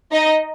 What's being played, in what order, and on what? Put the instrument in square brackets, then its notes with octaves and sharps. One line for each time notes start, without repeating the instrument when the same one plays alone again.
[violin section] D#4 D#5